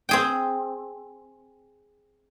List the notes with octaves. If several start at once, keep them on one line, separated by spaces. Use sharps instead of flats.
C4 G#4 G5